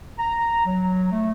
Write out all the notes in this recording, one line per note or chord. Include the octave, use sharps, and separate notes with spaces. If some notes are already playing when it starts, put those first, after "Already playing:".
A#5
F#3
A3